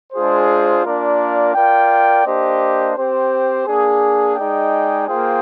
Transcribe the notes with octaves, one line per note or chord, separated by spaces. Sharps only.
G#3 D4 F4 G#4 C5
A#3 D4 F4 A#4 D5
F4 A#4 D5 G5
A#3 D4 G4 C5 D#5
C4 G4 C5
A#3 D4 G#4
G#3 D#4 G#4 D5 G5
A#3 F4 G#4 C5 G5